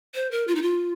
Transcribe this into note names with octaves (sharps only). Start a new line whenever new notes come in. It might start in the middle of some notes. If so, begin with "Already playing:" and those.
C5
A#4
F4
D#4
F4